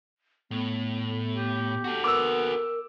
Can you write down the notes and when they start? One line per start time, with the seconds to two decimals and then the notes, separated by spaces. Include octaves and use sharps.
0.51 A2 B3
1.33 G4
1.84 F#4 A4
2.04 B3 A#4 D6 E6